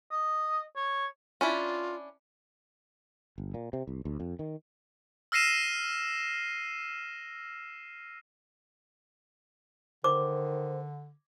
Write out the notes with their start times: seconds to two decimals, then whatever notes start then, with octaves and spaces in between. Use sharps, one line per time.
0.11 D#5
0.76 C#5
1.41 C#4 D4 E4 F4
3.38 G1
3.54 A#2
3.73 C3
3.87 C2
4.05 D2
4.20 F2
4.39 D#3
5.32 E6 F6 A#6 C7 D#7 E7
10.04 D3 D#3 C5 D6